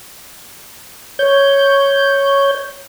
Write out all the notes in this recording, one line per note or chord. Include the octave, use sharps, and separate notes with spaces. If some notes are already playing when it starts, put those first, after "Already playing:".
C#5 G6